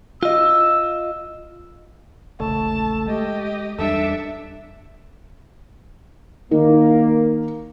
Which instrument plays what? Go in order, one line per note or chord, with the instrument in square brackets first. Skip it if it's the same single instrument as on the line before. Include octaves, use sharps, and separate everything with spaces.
[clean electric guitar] F4 D#5 [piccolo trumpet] E6
[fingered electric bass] E1 A#1 C#3 [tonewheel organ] A3 [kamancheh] A5
[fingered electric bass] G#3 [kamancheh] G4 D#5
[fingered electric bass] E2 G3 [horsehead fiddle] D4 E5 [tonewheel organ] A4
[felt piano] D#3 [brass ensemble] A#3